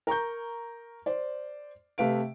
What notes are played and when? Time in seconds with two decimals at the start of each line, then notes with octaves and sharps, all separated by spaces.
0.07 A#4 A#5 C#6 G6
1.06 C5 D5
1.98 C3 A3 B4 F5 D7